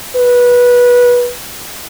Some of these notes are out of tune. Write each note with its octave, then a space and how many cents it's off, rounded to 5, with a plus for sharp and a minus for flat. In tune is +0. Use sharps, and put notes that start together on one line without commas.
B4 -20